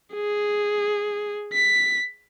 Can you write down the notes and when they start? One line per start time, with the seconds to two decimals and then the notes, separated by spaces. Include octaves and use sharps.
0.15 G#4
1.53 B6